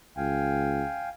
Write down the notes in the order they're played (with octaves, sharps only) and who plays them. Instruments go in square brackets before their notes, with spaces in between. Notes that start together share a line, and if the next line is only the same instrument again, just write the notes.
[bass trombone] C#2 [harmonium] F5 G5 G#5